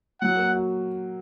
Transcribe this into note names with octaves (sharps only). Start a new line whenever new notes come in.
F#3 F#5
A#3
F#4